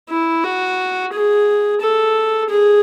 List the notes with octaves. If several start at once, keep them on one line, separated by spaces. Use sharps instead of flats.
E4
F#4
G#4
A4
G#4